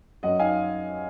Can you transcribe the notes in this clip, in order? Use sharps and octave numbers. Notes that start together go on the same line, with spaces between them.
F#2 D#5 F#5
D#4 F5 G#5